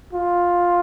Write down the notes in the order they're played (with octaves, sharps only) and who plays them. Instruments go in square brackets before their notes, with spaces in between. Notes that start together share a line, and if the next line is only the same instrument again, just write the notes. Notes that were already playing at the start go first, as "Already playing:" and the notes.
[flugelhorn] F4